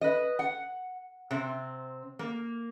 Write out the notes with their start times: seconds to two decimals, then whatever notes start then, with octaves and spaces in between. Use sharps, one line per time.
0.01 B4 D#5
0.39 F#5
1.31 C3 C4
2.19 A#3